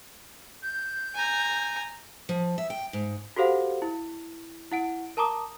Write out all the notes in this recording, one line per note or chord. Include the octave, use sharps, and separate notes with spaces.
G6
G#5 A#5
F3
E5
G5
G#2
F#4 G4 A4 C5 F5 F#5
E4
E4 F#5 D7
A#4 A5 A#5 D6 D#6